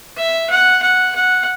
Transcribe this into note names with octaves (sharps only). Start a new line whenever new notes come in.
E5
F#5
F#5
F#5